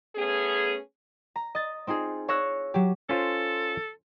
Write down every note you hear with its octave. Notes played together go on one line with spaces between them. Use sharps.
A3 B3 C#4 G#4
A#5
D#5 A6
C4 D#4 F4 G#4
C#5 F5 C#6 E6 F#6 A#6
F#3 G4
C#4 F4 A4 C5